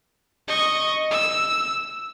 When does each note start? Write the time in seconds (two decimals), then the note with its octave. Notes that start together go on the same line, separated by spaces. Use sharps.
0.48 D#5 C#6
1.11 E6